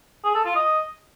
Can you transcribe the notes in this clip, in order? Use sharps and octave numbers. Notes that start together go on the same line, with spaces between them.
G#4
A4
F4
D#5